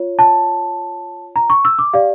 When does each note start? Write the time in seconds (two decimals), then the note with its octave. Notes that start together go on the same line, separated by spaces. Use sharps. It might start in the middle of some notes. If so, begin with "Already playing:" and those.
Already playing: F4 C#5
0.19 A5
1.36 A#5
1.50 C#6
1.65 E6
1.79 D6
1.94 G4 D5 F5